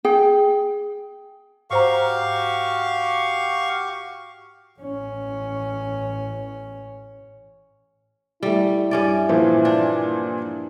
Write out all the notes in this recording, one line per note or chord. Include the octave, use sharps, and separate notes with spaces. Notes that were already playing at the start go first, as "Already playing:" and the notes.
G#4 G5
G#2 F#4 G4 C5 F5 A#5 C#6
A1 C#4
G3 A3 E4
G2 C#4 D5
A#2 E3 F3
D4